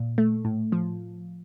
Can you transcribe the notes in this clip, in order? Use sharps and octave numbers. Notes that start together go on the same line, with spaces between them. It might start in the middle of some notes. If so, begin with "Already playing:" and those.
Already playing: A#2
A3
A2
F3